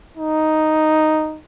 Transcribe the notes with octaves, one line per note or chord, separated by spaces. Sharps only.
D#4